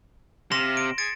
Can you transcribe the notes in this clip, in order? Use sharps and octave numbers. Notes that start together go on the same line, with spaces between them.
C3 F5 C6 A#6 E7
D7
G#4 A6 C#7 D7